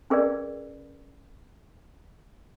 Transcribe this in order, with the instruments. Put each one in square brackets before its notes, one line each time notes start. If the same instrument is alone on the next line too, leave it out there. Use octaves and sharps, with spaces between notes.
[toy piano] C#4 G#4 A#4 B4 D5